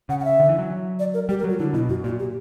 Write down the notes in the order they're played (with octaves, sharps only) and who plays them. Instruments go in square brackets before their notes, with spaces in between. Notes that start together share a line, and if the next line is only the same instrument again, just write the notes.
[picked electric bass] C#3 [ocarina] F#5
[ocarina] F#5
E5
[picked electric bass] D3
E3
F#3
[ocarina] D5
A#4
[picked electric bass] G3 [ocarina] G4
[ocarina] A#4
[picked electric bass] F#3
[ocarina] F#4
[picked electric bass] D3 [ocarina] E4
[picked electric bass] B2 [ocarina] E4
[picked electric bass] F#2 [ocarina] F#4
[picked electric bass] A#2 [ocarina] F#4
[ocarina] G4